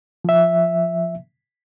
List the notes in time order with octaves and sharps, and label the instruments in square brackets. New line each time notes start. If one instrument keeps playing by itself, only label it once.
[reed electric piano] F3 E5